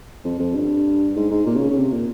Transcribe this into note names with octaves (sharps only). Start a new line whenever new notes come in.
F2
F2
G2
G#2
G#2
A#2
C#3
C#3
C3
A#2